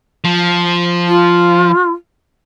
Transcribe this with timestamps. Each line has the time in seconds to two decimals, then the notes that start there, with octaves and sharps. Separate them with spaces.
0.25 F3
1.08 F4